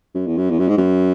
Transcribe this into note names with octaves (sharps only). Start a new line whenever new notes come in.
F#2
E2
F#2
E2
F#2
G#2
F#2